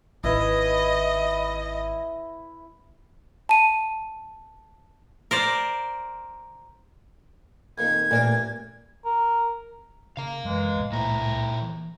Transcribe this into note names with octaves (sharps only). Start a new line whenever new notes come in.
G#1 E4 B4 D#5
A5 D#7
A#4 C5 D5
F2 A#2 D#3 G#6
A1 A#2 D4 A#4 D5
A#4
C#3 F5 A#5
F1 F#2 E3 G#3
C#2 A2
A#2 E4 C5 G5 A#5
E3